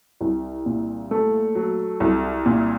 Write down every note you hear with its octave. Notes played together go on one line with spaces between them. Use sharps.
C2
A#2
A3
F#3
C2
A#2